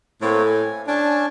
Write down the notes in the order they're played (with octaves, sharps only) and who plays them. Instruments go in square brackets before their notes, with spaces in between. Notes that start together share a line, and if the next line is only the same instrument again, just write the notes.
[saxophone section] A2 [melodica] A#3 C4 C#5
[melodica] G#5
[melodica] C#4 G#5 A5 [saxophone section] D4